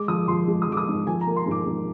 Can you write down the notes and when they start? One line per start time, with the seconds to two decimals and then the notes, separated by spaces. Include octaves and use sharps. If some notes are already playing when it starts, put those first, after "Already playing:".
Already playing: G#3 D6
0.08 F3 D#6
0.28 F3 C6
0.48 G#3
0.62 D#6
0.67 F3 D6
0.77 D#6
0.87 G#2
1.07 F3 G#5
1.21 A#5
1.27 A#3
1.36 C6
1.46 G#2
1.51 D6
1.66 G#2